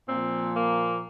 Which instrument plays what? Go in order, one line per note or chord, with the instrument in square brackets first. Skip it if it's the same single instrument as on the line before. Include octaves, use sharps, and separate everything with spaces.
[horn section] A#2 F3 C4
A#3